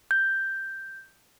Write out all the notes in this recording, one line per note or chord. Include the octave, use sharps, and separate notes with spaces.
G6